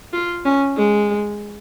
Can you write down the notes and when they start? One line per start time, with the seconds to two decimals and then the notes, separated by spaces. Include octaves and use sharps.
0.13 F4
0.45 C#4
0.76 G#3